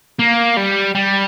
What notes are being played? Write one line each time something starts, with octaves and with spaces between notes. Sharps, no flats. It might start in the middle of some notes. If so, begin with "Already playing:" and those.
A#3
G3
G3